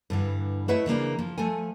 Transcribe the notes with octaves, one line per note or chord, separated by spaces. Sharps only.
G2 D3 E3
A3 E4 B4 C#5 D#5 E5
C#3 E3 A#3 D4
F3
F3 A3 A4 G#5